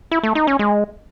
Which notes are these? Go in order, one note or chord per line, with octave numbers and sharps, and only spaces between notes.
E4
A3
D#4
C#4
G#3